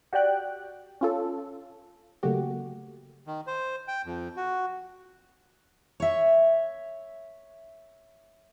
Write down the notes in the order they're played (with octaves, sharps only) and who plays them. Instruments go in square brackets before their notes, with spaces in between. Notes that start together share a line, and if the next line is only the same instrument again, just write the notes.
[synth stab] F#4 G4 D5 G5 F#6
C#4 F4 A4
C#3 F#3 A3 A#3 F#4 G4
[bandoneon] D#3
C5
G5
F2
F#4
[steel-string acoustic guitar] C#5 E5